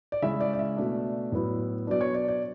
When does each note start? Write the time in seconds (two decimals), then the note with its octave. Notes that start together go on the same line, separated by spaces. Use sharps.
0.12 D5
0.22 C#3 G#3 C#4 E4 E5
0.41 D5
0.53 D5
0.59 E5
0.77 B2 A3 D4
1.32 A2 F#3 B3 E4
1.87 B2 F#3 B3 D4 D5
2.01 C#5
2.14 D5
2.28 D5